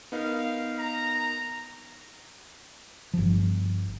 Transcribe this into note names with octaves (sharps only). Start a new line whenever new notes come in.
B3 D#4 A#4 F5
A#5
G1 F3